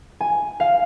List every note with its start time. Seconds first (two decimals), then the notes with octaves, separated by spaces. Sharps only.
0.20 G#5
0.60 F5